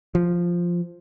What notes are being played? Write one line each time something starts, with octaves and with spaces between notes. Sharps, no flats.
F3